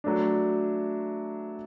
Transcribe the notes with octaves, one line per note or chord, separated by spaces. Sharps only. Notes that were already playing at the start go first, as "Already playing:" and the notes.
F#3 A3 D4